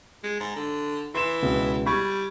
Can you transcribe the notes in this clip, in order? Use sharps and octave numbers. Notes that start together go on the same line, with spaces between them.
G#3
G#2
D3
E3 C6 E7
C#2 B2
G3 B5 C#6 G#6